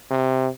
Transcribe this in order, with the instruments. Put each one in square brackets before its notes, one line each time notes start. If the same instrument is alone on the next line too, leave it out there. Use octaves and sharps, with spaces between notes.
[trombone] C3